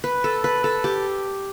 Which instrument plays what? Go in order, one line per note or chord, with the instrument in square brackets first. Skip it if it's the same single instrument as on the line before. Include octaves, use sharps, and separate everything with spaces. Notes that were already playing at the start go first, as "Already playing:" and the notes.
[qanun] B4
A4
B4
A4
G4